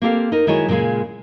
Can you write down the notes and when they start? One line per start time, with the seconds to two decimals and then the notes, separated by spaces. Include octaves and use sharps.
0.02 A#3 C4 G4 A4 F5
0.32 D#4 A#4
0.47 D#3 G#3 E4 F#4 G#4 C#5
0.69 A#2 C#3 G#3 G#4 F5